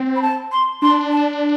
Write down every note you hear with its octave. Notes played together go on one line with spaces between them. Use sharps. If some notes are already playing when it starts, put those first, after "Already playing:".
Already playing: C4
B5
A5
C6
D4 C6
A5